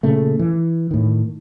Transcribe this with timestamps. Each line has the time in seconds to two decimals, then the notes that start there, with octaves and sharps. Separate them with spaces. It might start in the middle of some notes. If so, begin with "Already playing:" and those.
0.03 A#2 C#3 A3
0.39 E3
0.91 A2 D#3